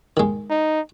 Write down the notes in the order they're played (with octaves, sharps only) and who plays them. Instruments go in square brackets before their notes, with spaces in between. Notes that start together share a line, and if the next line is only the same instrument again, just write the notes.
[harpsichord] D#3 G#3
[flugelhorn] D#4